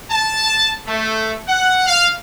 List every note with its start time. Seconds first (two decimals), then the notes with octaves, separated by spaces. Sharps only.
0.11 A5
0.87 A3
1.48 F#5
1.87 F5